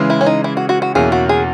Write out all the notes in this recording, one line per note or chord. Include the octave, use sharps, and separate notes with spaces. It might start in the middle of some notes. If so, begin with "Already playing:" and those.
Already playing: C#3 E3 G#3
E4
C#4
D#4
E4
F#4
F#4
F#4
E2 B2 A#3 C#4 E4 G#4
F#4
G#4